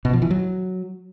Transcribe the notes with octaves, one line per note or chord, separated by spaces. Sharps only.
B2
F3
E3
F#3